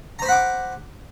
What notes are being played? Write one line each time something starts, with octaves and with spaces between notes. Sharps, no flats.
C5 F#5 A#5 B5 D6